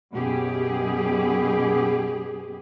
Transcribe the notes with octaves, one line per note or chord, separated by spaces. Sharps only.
F#2 B2 G4 G#4